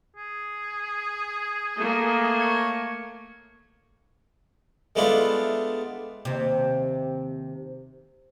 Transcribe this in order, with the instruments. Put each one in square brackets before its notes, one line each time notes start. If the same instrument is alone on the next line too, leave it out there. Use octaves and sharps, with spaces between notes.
[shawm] G#4
[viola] A3 A#3
[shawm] C#5
[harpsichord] G#3 A3 B3 D4 E4 F4
[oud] D#2 C3